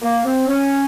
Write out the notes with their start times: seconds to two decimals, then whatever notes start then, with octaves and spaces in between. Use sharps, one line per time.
0.02 A#3
0.25 C4
0.47 C#4